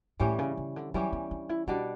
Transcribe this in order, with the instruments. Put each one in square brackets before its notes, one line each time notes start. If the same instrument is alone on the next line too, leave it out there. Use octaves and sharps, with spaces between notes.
[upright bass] A2 [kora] E3 G3 C#4 G4
[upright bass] C#3
C#3
D3
[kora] E3 G3 C#4 G4 [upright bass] F#3
[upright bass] B3
D4
E4
[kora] B2 G3 D4 [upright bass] E4